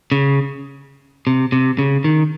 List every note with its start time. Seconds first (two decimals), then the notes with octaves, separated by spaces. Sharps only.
0.12 C#3
1.27 C3
1.52 C3
1.79 C#3
2.04 D#3